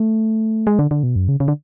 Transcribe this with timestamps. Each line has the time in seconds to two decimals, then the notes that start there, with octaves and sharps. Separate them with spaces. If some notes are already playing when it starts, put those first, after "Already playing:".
Already playing: A3
0.67 G#3
0.79 D3
0.91 D3
1.03 B2
1.16 F#2
1.28 C#3
1.40 C#3
1.48 D3